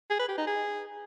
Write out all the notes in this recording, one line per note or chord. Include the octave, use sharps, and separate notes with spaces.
G#4
B4
G4
D#4
G#4